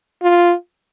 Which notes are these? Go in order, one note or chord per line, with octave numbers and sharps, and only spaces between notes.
F4